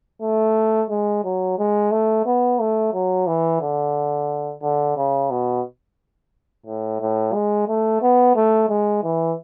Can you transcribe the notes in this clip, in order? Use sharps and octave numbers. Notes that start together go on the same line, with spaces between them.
A3
G#3
F#3
G#3
A3
B3
A3
F#3
E3
D3
D3
C#3
B2
A2
A2
G#3
A3
B3
A3
G#3
E3